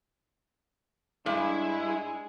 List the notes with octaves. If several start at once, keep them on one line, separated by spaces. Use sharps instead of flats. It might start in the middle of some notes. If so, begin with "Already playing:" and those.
G2 G#3 E4